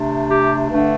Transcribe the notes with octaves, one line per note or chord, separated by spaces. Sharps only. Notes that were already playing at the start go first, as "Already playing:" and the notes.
Already playing: C3 A3 D4
G4
G2 D3 A3 D4